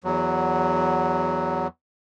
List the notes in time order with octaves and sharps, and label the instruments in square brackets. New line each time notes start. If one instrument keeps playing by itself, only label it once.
[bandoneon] E2 F#3